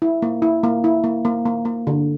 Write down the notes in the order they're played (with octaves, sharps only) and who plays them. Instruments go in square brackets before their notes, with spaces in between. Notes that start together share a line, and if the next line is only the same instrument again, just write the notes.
[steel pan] E4
A#3
E4
A#3
E4
A#3
A#3
A#3
A#3
D3